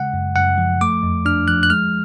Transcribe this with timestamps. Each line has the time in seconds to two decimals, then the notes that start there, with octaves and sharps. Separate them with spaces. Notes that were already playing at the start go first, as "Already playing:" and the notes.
Already playing: C#3 G#3 F#5
0.14 F#2
0.36 F#2 F#5
0.58 F3
0.81 A3 D6
1.03 F2
1.25 D4 F6
1.48 F3 F#6
1.63 F#6
1.70 G#3 F6